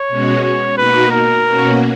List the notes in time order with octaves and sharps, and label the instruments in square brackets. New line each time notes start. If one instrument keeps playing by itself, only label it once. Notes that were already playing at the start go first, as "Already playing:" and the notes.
Already playing: [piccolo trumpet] C#5
[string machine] B2 G#3 C#4 F#4
[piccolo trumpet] C#5
[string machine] B2 A#3 D#4 F#4 [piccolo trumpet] B4
[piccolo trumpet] A#4
[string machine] B2 A#3 C#4 F#4